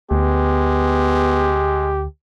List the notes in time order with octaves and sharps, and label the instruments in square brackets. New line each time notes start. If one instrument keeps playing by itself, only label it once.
[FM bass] D2 [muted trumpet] G#3 [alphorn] B3 [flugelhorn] G4